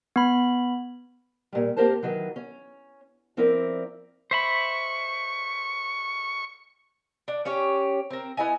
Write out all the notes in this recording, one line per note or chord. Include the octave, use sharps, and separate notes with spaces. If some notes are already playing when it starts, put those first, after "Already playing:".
B3 B5
A#2 G3
A#3 C4 G4 A#4 C5 A5
D#3 E3 F#3
C#4
F3 C4 E4 A#4 D5
C5 E5 B5 C#6
D4
C#4 G4 C#5
C4 A#4
B3 E4 D#5 G#5